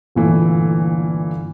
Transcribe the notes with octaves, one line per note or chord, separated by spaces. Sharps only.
G1 A#2 E3 A3